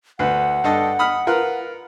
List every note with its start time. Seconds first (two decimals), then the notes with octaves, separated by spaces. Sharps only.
0.19 D2 B4 F#5
0.64 G2 A4 D#5
0.99 B5 D#6 F6
1.27 F4 A#4 B4